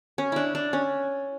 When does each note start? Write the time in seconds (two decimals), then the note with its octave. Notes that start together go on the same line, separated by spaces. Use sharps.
0.18 C#4
0.32 D4 E4
0.55 D4
0.73 C#4